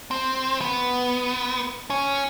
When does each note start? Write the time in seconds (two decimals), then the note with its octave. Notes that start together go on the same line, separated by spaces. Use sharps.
0.11 C4
0.61 B3
1.90 C#4